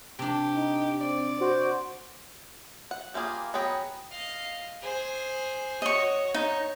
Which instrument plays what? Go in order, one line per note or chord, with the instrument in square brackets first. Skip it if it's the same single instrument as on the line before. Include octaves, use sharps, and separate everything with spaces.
[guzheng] C3 D4 [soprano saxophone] G4
[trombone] D#4
[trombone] C4 [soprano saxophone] D5
[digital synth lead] F#4 [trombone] C5
[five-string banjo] F#5
G3 A#3 F4 G#4
F#3 B3 G#4 G5 A#5
[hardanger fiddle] D#5 F5
G#4 C5
[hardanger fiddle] F#4 C#5 [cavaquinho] D#5 C#6
[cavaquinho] D#4 [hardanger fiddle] C#5